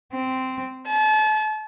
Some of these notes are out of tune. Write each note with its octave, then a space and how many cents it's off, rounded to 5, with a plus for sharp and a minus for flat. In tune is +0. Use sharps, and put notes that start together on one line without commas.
C4 -10
A5 -35